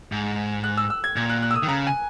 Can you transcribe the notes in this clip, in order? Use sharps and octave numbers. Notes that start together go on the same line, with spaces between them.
G#2
F#6
E6
E6
G#6
A#2 G#6
F#6
F#6
E6
D#6
D#3
C#3 A#5
G#5